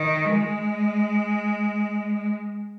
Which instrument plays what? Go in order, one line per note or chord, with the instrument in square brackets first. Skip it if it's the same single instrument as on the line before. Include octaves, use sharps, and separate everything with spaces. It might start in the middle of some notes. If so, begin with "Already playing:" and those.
Already playing: [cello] D#3
G#3